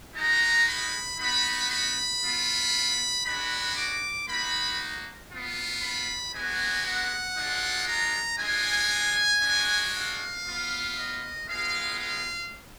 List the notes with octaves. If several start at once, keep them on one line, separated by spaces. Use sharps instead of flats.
G#3 D#4 F#4 A#5
B5
B3 D#4 F#4 B5
B5
B3 F4
G#3 D4 F#4 B5
D6
A#3 D#4 F#4 B5
B3 F4
B5
G#3 B3 D4 F#4 G#5
F#5
G#3 D4 F4
A#5
G#3 D4 F4 G#5
G#3 D4 F#4
F5
B3 F4
D#5
G#3 B3 F4 F5
F5